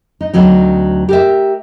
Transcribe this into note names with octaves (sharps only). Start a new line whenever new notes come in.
D#4
D2 F#3 C4 D#4
G4 A#4 E5